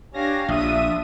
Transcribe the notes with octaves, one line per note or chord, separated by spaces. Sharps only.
D4 G4 C#5 F5 G#5 A#6
A#1 D4 F4 E5 D#6 D#7